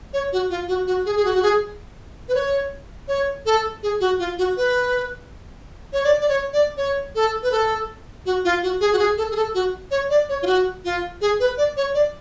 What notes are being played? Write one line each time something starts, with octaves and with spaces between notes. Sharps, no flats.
C#5
F#4
F4
F#4
F#4
G#4
G#4
F#4
F#4
G#4
B4
C#5
C#5
A4
G#4
F#4
F4
F#4
B4
C#5
D5
D5
C#5
D5
C#5
A4
B4
A4
F#4
F4
F#4
G#4
F#4
G#4
A4
G#4
A4
F#4
C#5
D5
C#5
F4
F#4
F4
G#4
B4
D5
C#5
D5